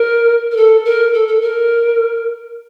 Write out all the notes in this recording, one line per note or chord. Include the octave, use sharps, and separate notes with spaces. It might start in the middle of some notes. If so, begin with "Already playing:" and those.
Already playing: A#4
A#4
A4
A#4
A4
A4
A#4